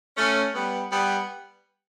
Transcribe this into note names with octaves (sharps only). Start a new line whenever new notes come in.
A3 C#4
G3 B3
G3 B3